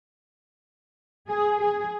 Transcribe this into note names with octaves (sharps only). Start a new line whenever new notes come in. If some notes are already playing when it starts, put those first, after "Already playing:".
G#4
G#4